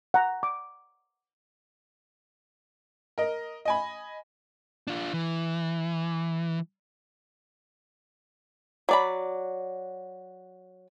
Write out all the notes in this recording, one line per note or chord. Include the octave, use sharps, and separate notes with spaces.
F#5 A#5
D6
A#4 D#5
D#5 G#5 B5
D4 F4
E3
F#3 D5 B5